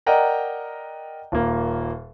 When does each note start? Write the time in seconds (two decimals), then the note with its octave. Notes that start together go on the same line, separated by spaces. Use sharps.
0.06 A#4 D5 D#5 F#5 G5 A#5
1.32 D#1 A#3